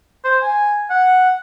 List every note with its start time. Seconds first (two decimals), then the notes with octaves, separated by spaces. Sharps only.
0.24 C5
0.43 G#5
0.90 F#5